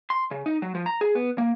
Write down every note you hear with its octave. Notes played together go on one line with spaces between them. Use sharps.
C6
C#3
D#4
F#3
F3
A#5
G#4
B3
A#3